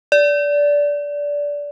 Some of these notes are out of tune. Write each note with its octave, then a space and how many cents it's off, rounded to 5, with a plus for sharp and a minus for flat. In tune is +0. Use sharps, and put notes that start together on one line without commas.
D5 -15